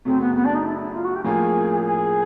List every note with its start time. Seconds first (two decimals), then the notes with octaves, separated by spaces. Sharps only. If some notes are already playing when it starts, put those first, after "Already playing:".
0.05 F#2 C#3 F#3 A3 C4
0.21 B3
0.35 B3
0.45 D4
0.54 D#4
0.66 E4
0.95 F4
1.04 F#4
1.15 G4
1.24 A2 F3 A#3 C#4 F4 G#4
1.83 G#4